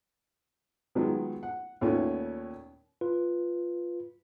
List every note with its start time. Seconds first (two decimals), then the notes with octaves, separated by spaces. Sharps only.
0.95 D#3 F#3 G#3 B3 F4
1.43 F#5
1.81 D#2 A#2 A3 B3 C#4
3.01 F4 B4